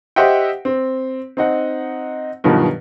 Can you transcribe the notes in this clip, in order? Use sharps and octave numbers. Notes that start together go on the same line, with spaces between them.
G4 C5 D#5 E5 F#5 G5
C4
C4 D#4 F#5
G2 B2 D#3 F3 F#3